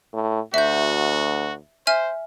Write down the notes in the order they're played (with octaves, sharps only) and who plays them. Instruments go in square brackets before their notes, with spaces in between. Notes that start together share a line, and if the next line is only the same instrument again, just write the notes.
[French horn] A2
[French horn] D2 [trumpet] F#4 [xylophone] E5 G6
[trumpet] C5 [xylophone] E5 G#5 F6